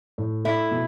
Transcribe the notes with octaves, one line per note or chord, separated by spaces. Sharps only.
A2
A3 E4
B2